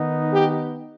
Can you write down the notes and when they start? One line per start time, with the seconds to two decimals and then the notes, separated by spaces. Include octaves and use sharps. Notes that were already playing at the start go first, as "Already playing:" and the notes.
Already playing: D#3 B3 D#4
0.33 G4